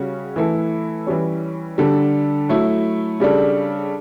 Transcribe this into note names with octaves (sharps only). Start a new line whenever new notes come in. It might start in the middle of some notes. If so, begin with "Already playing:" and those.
Already playing: C#3 G3 C#4 F#4
E3 A3 E4 A4
E3 G3 C#4
D3 G3 D4 A4
F#3 A3 E4
C#3 G3 D4 A4